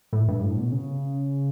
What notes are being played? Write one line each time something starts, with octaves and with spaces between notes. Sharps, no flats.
A2
G2
A2
B2
C#3